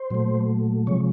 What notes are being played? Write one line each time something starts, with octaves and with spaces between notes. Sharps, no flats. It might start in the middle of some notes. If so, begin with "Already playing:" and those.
Already playing: C5
A#2 F#3 A3
C3 F3 G#3 C#5